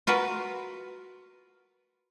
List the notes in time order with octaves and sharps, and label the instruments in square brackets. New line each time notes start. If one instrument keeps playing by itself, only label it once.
[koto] F4 F#4 A#4 B4